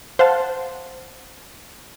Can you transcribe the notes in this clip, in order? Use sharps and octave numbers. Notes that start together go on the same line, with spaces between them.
C5 F5 F#5 A5